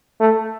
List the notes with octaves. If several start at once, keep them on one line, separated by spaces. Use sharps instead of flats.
A3